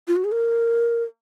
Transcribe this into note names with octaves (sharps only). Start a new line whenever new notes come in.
F4
F#4
G#4
A#4